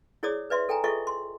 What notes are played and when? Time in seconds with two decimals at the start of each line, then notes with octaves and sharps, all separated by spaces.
0.23 E4 G#4 C#5 D5 D#6
0.50 B4 D5 E5 C6
0.69 A4 G5 G#5 A#5
0.84 F4 G#4 A4 D#5 E5 C#6
1.07 C6